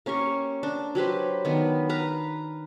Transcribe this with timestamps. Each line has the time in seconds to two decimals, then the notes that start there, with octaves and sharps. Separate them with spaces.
0.06 A#3 C#4 G4 C#6
0.63 D4
0.95 F#3 G4 B4 C5
1.45 D#3 B3 D4
1.89 B4 F5 A#5